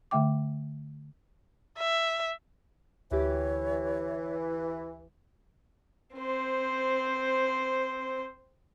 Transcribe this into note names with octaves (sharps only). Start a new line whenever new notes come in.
D3 A3 E5 G5 D6
E5
D2 E3 G4 C#5
C4 C5